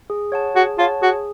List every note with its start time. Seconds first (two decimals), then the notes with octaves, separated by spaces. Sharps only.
0.10 G#4
0.32 C#5 F#5 A5
0.56 F#4 G#4
0.78 F4 C#5 F#5 A5
1.02 F#4 G#4